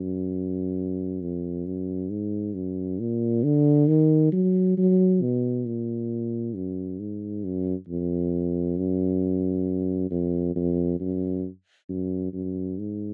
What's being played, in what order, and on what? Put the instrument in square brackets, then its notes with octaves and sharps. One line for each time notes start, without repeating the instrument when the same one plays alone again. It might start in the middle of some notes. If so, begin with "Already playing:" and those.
Already playing: [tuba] F#2
F2
F#2
G#2
F#2
A#2
D3
D#3
F#3
F#3
B2
A#2
F#2
G#2
F#2
F2
F#2
F2
F2
F#2
F#2
F#2
G#2